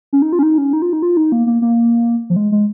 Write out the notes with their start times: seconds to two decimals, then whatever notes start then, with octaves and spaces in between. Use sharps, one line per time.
0.13 C#4
0.22 D#4
0.32 F4
0.39 C#4
0.43 D#4
0.58 C#4
0.73 D#4
0.82 F4
0.93 D#4
1.02 F4
1.17 D#4
1.32 A#3
1.47 A#3
1.62 A#3
2.30 F3
2.36 G#3
2.52 G#3